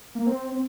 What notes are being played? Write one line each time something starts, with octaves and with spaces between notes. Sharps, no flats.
A#3
C4
C4